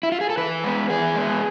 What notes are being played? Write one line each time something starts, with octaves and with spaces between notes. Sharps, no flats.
E4
F4
G#4
A4
E3 B4
G#3 B3
E3 G#4
G#3 B3